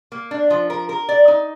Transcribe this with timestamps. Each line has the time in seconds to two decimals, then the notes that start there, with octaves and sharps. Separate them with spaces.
0.12 A#3
0.31 D4
0.50 F3
0.70 A#4
0.89 A#4
1.09 D5
1.28 D#4